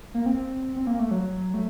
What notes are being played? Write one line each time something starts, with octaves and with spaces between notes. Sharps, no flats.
A#3
C4
C4
A#3
A3
F#3
A3